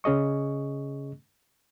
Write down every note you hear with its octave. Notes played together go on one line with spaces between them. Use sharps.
C#3 C#4 G#4 D#5 C#6